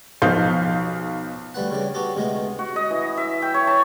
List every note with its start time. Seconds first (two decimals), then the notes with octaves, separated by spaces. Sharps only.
0.22 B1 F3 D#4 F5 G6
1.54 D2 G3 B4 F#5
1.71 C#3 G3 D4
1.94 B3 F#4 G4 A4
2.15 D2 C3 G#3 A3 B3
2.59 F#4
2.76 D#5
2.91 E3
3.17 E5
3.42 G5
3.54 C#5
3.67 A5